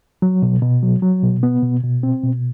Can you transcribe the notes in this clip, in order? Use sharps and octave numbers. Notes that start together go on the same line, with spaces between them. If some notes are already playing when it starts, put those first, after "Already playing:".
F#3
B2
B2
F#3
F#3
B2
B3
B2
B2
C4
B2